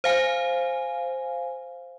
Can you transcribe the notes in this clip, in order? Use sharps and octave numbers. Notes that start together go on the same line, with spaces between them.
C5 F5 G#5